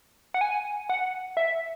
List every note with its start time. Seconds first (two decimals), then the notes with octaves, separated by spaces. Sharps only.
0.34 F#5
0.41 G#5
0.89 F#5
1.37 E5